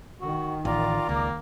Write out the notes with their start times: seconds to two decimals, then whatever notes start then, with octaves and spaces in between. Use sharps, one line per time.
0.21 D#3 F#4
0.65 A1 F4 D5 A#5 D6
1.09 C#2 A#3